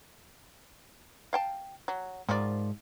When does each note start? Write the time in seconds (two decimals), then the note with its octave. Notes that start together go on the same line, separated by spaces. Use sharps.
1.33 F5 G5 A5
1.88 F#3
2.29 G#2 D#3 F3 D5